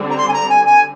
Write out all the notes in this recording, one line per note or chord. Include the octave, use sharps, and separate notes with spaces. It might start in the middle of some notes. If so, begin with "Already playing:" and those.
Already playing: D3 G3 C4
A#5
C6
G#5
A#5
G#5
G#5